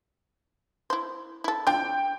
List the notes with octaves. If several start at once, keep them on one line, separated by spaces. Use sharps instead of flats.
E4 C5
E4 A4
C4 D4 F4 G5